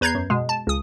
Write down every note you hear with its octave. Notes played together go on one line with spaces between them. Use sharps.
E2 B4 A#5 G6 G#6 C7
F#2
B2 G#3
A5
C#2 D#6